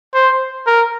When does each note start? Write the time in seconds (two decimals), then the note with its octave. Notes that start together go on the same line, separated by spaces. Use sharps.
0.14 C5
0.67 A#4